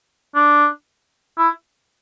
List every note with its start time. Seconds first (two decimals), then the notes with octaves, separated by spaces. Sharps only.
0.35 D4
1.38 E4